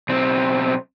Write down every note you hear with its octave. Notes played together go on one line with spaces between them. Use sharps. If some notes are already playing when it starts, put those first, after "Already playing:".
B1 C4